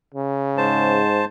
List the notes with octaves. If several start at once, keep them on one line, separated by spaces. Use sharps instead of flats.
C#3
G#2 C5 A5